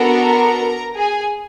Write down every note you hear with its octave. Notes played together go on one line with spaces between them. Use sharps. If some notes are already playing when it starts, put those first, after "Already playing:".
Already playing: B3 D4 F#4 A4 A#4 A#5
G#4 G#5